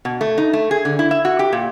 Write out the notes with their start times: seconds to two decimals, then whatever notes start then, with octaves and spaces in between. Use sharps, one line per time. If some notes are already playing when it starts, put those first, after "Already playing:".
0.05 B2
0.21 A3
0.38 D#4
0.53 A3
0.71 G#4
0.85 D3
0.99 E4
1.11 E5
1.25 F#4
1.39 G4
1.53 A#2